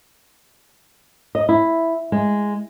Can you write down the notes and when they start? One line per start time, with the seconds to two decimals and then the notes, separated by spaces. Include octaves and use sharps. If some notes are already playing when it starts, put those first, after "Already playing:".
1.35 D#5
1.49 E4
2.12 G#3